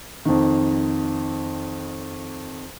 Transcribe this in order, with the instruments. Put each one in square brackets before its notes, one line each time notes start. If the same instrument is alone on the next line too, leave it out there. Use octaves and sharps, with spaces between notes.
[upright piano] F2 D#3